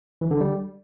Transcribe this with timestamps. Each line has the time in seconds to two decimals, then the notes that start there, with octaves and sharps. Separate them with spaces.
0.21 E3
0.31 D3
0.40 G3